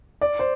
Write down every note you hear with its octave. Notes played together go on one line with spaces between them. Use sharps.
D5
C5